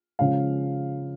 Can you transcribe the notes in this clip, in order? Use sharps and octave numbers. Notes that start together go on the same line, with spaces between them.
C#3 F3 G#3 C#4 F5